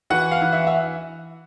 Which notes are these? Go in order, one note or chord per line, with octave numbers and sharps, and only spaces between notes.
E3 F#4 F#5
F5
E3
E5
E5